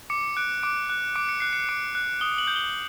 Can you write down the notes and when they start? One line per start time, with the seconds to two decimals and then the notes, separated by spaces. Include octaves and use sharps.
0.10 D6 C#7
0.37 F#6 D7
0.63 D6 D7
0.89 F#6
1.16 D6 D7
1.29 C#7
1.40 F#6 C7
1.53 C#7
1.69 D6 D7
1.95 F#6
2.21 D#6 G7
2.38 F#7
2.48 G6
2.56 G7